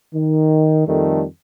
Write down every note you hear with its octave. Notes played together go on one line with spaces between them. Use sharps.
D#3
F2 D#3 G3 A3 A4